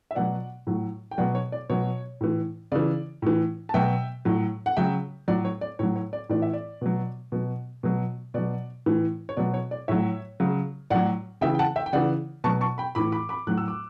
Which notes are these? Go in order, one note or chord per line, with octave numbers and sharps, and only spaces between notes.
E5
B2 F#3 D5 F#5
A2 F#3
G5
B2 F#3 D5 F#5
C#5
D5
B2 F#3 C#5
A2 E3
C#3 E3 D5
A2 E3
A5
B2 F#3 E5 G5
A2 F#3
F#5
C#3 F#3 E5 G5
A2 F#3 D5
C#5
D5
A2 F#3 C#5
C#5
D5
A2 E3 D5
E5
D5
B2 F#3
B2 F#3
B2 F#3
B2 F#3 D5
A2 E3
C#5
B2 F#3 D5
C#5
D5
A2 F#3 C#5 E5
C#3 F#3
A2 F#3 D5 F#5
C#3 E3 E5 G5
G5
F#5 A5
E5 G5
G5
C#3 E3 D5 F#5
B2 F#3 A5 C#6
A5 C#6
G5 B5
A2 E3 B5 D6
B5 D6
B5 D6
A2 F#3 F#6
E6
D6